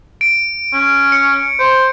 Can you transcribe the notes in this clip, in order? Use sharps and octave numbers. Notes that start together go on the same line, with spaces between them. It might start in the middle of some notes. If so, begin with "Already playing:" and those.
D7
C#4
C#7
C5